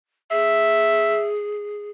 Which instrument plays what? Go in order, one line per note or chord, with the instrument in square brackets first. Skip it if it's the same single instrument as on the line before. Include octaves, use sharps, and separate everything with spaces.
[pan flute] G#4 [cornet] E5